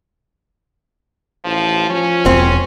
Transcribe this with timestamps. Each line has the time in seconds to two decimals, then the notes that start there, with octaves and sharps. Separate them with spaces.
1.45 A1 F3
1.90 F3 C#4
2.26 E1 C4